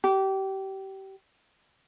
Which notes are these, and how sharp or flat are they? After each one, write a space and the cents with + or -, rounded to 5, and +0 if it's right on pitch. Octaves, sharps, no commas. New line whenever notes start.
G4 -25